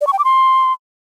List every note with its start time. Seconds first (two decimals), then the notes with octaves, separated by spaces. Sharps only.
0.01 D5
0.07 C#6
0.13 G5
0.19 D6
0.24 C6